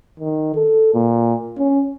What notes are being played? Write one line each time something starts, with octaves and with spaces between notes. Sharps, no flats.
D#3
A4
A#2
C#4